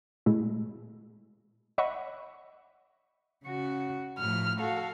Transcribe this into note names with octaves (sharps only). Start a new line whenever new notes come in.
A#2 G#3 A3 E4
C#5 D#5 E5 F#5 B5 C#6
C#3 F#4
A2 F3 F6
F#4 A4 F5